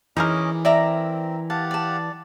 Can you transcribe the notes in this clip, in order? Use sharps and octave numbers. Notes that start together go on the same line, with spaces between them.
E3 C#4 D#4 G#4 A#4 D#5 D6
C4 A#4 D5 E5 A#5
G4 F5 F#5 A5
D5 A5